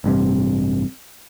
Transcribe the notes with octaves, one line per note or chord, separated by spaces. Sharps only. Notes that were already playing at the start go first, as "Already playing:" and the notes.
A1 G2 C3